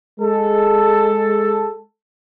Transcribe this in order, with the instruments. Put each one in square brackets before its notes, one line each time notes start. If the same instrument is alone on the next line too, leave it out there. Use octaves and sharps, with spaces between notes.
[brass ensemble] G#3 A4